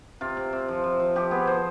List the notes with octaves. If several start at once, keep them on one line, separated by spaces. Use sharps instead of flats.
C3 F4
C3
C3
F3
F3
F3
F3 G4
B3 G#4
F3 C5